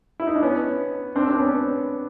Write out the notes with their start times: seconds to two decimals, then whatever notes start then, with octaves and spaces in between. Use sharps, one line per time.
0.20 E4
0.27 D#4
0.36 D4
0.43 B3 C#4
1.16 C4 D4
1.28 C4 D4
1.39 B3 C#4